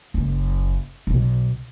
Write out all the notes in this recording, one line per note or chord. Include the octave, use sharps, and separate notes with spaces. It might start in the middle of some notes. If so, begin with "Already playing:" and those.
F#1
B1